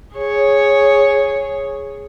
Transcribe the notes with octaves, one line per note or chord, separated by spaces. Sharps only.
G#4 C#5